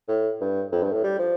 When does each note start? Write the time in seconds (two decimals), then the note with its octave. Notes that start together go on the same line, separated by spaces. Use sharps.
0.08 A2
0.41 G2
0.72 F2
0.82 G2
0.92 A2
1.04 G3
1.19 F3